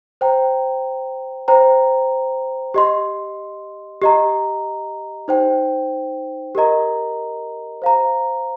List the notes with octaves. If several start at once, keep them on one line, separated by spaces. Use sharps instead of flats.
C5 G5 A#5
C5 G5 A#5
G4 D#5 C6
G4 D#5 A#5
D#4 C5 G5
G4 A#4 D#5 A#5
C5 F5 A#5